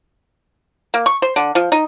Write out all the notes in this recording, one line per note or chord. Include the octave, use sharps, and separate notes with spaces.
A#3
C#6
C5
D3
F3
D#4